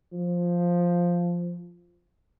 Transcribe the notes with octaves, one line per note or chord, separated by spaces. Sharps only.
F3